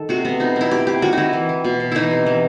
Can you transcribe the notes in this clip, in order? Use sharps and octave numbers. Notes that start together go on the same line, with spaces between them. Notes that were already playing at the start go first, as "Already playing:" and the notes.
Already playing: D#3 A4
C3 F#4
C3 B3
B2 D#4
B3
E4
C3 G4
C3 G4
D#3 F#4
D#3 D#4 E4
E3
E3
B2
B2
E3 D#4 E4
C3
E3